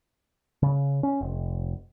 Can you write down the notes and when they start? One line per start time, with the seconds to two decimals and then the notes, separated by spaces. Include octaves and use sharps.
0.63 C#3
1.03 C#4
1.21 F1